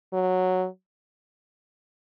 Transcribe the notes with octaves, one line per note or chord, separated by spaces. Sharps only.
F#3